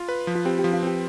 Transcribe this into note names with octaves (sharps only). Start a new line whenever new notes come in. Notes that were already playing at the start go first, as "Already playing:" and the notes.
Already playing: F4
B4
F3
F4
C4 G4
G4
F3
F4
C4 G4